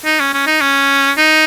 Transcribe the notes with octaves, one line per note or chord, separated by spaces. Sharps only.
D#4
C#4
C#4
D#4
C#4
D#4